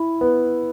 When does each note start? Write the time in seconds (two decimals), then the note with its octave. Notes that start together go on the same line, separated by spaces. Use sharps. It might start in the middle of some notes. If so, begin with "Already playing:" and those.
Already playing: E4
0.21 B3